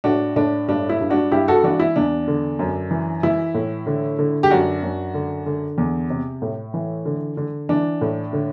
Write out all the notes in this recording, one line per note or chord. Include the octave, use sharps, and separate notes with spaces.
A2 D4 F#4
A2 D4
G2 D4
E4
G2
D4 F#4
G2 E4 G4
F#4 A4
E3 D4 F#4
E4
E2 D4
D3
F#2
E3
E3 E4
A2
D3
D3
G4
F#2 D4 F#4
F#2
D3
D3
E2
C3
A2
E3
D3
D3
E3 D4
A2
D3